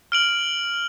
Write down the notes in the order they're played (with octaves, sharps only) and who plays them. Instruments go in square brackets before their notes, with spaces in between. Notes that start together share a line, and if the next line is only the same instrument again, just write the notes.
[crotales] F6 D7 F#7